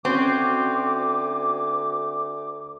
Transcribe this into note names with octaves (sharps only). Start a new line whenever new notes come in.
D2 C4 C#4 F#4 C6 D6